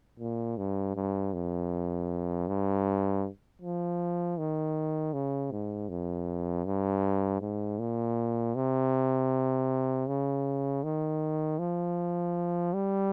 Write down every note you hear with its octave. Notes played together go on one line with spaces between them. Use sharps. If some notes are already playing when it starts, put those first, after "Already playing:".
A#2
G2
G2
F2
G2
F3
D#3
C#3
G#2
F2
G2
G#2
A#2
C3
C#3
D#3
F3
G3